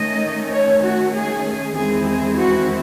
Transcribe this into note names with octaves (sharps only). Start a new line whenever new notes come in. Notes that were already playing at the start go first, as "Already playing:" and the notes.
Already playing: D#3 A3 C#4 D#5
C#5
F#4
G#4
E2 D#3 G#3 C4 E4 G#4
G#4
F#4